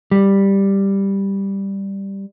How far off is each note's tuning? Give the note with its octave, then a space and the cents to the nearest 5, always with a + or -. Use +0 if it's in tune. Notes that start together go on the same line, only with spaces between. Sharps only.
G3 +5